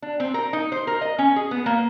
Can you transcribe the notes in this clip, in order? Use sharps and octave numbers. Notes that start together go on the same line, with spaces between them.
D4
C4
A#4
D#4
C5
A#4
D#5
C#4
G#4
B3
A#3